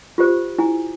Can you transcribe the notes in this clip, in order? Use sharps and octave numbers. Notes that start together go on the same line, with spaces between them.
F4 G4 C5
E4 G#5